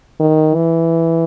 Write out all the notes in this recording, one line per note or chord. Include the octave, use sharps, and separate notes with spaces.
D#3
E3